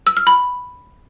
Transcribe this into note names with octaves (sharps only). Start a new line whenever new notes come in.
E6
F6
B5